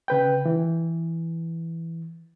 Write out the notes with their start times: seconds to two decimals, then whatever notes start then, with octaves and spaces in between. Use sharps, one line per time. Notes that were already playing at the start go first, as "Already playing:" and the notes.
0.08 C#3 B4 G5
0.45 E3